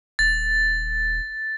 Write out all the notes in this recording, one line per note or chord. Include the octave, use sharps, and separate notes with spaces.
D#1 A6